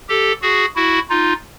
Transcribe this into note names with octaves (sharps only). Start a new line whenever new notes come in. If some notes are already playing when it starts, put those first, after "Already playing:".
G4 A4
F#4 G#4
E4 F#4
D#4 F4